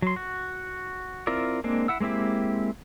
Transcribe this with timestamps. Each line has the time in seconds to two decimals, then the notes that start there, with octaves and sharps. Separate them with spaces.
0.02 F#3 C6
0.16 F#4
1.27 C4 E4 F4 A#4 D5
1.64 G#3 A#3 C4 D4
1.88 E4 F#5 E6
2.00 G#3 A#3 C4 E4 G4